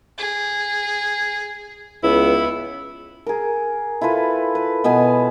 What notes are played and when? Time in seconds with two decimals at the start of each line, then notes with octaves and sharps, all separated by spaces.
0.18 G#4
2.04 C#2 B3 E4
3.26 G#4 A#4
4.01 E4 F4 A4 B4
4.55 B4
4.84 B2 B3 B4 G#5